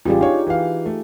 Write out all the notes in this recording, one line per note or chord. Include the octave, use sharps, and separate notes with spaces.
A1 G3 F4 G4 G#4
D4 D#4 C#5 F5
E3 F5
A3